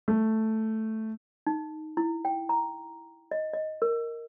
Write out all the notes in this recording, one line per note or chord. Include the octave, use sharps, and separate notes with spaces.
A3
D#4
E4
G5
A#5
D#5
D#5
A#4